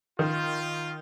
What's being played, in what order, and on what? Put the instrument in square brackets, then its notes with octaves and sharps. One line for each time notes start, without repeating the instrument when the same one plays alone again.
[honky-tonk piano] D#3 [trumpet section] F4